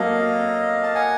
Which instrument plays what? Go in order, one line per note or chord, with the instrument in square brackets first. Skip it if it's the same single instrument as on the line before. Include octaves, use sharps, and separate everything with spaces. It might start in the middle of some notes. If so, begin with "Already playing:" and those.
Already playing: [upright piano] F#3 A#3 A4 [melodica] D#5 F5
[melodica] A5
F#5 G#5